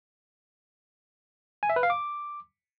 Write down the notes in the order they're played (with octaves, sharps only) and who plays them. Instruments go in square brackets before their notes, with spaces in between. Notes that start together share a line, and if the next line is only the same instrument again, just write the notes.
[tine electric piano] G#5
E5
B4
F5
D6